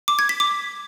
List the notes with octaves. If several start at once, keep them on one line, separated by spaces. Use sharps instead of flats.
D6
G#6
B6
D6